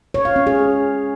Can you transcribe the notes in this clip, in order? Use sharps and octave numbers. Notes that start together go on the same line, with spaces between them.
C#5
F5
C#4
G#4